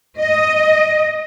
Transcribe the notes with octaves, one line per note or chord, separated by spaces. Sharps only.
D#5